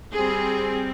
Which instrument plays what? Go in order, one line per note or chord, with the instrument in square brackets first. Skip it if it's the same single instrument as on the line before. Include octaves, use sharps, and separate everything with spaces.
[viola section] G3 C4 G#4